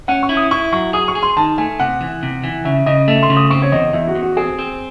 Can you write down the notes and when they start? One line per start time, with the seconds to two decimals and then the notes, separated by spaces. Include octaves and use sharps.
0.08 C#4 F#5
0.23 C#6
0.29 E4
0.37 D#6
0.51 E4 C#6
0.72 F#3 C#6
0.93 G#4 D#6
1.08 C#6
1.15 G#4
1.23 C6
1.37 D#3 A5
1.58 A3 G#5
1.80 C3 F#5
2.01 E3
2.23 C3
2.44 E3
2.65 C#3 E5
2.86 C#3 D#5
3.08 A3 E5
3.23 C6
3.30 C#3
3.37 D#6
3.50 C4 C#6
3.62 C#5
3.72 E2 D#5
3.93 E2 E4
4.08 F#4
4.15 E2
4.22 F#4
4.37 C4 G#4
4.59 C4